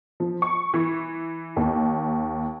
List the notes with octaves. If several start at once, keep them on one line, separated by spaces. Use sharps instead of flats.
F3
C#6
E3
D#2